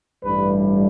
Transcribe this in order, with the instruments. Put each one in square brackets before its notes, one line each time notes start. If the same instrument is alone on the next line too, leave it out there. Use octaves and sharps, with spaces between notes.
[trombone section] A1 G2 E3 G3 B4